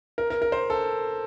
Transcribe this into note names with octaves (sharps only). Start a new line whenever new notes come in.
A#4
A#4
A#4
C5
A4